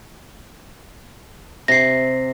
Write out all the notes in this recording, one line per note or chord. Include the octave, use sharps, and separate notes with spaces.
C3 A#6 C7